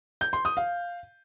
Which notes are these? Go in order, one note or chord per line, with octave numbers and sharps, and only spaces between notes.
G6
C6
D#6
F5